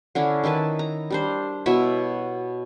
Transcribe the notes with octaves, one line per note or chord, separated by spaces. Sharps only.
D3 C#4 D4 E4
D#3 E4 B4 A5
A#5
G3 D4 C5
B2 E4 C#5 E5